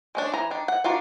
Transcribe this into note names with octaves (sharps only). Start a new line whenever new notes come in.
G#3 C#4 D4
E3 A#5
D#3 D4
F#5
D4 F4 F#4 A#4